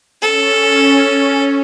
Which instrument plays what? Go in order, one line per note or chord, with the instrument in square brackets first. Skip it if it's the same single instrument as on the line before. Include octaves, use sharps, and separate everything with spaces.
[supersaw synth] C#4 [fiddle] A4